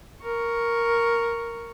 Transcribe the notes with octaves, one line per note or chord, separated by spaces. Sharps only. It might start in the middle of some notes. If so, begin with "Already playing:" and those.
A#4 C#6